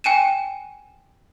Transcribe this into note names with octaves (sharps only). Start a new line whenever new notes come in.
G5 G#5 D#7 E7